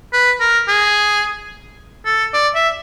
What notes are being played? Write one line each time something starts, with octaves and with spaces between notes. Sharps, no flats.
B4
A#4
G#4
A4
D5
E5